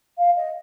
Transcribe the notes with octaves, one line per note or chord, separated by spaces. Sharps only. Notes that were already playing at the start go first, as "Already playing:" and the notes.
F5
D#5